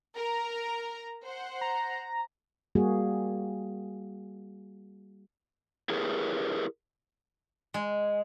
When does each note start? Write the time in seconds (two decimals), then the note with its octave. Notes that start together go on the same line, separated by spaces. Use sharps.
0.16 A#4 A#5
1.23 C5 F#5
1.61 A#5
2.75 G3 A#3 F#4 G#4
5.89 E4 G4 G#4 A#4 B4 C#5
7.74 G#3